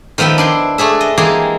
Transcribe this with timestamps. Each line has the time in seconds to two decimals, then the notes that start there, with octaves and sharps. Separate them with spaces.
0.18 D#3 F3 B3 E5 G5
0.38 D4 E4 C6
0.78 A3 D4 G#4 E5
1.00 D#5
1.18 E3 G#3 A#3 G4 G#4